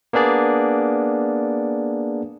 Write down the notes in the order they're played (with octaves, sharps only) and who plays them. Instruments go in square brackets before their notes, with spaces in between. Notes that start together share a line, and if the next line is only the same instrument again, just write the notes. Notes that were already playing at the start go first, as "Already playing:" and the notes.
[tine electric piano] A#3 B3 D4 G#4 D5